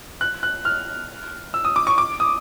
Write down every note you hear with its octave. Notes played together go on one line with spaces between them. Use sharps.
F#6
F#6
F6
E6
D#6
D6
C#6
D6
D#6